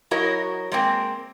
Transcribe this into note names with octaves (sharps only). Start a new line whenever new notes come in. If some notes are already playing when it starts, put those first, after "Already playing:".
F#3 E4 F#4 A#4 C#5 D#5
G#3 A#3 C4